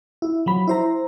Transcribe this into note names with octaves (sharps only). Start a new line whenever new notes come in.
E4
F3 F#3 B5
E4 C5 A#5